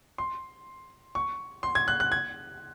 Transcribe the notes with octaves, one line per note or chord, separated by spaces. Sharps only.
C6
C#6
C6
G#6
F#6
F#6
G#6